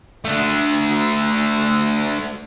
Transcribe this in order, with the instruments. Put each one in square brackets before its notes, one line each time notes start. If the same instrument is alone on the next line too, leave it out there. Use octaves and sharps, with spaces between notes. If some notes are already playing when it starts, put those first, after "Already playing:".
[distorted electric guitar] A3 D4